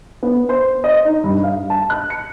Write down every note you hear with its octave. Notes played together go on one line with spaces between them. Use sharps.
B3
C5
D#5
D#4
G2
F5
A5
F#6
C#7